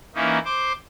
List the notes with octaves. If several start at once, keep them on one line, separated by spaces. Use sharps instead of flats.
E3 A#3 C#4 D#4 E4
C5 C6 D6